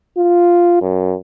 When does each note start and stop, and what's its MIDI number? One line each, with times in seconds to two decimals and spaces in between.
0.17 0.76 65
0.81 1.15 42